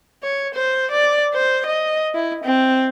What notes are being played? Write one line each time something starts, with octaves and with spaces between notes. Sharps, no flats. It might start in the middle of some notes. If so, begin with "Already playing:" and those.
C#5
C5
D5
C5
D#5
E4
C4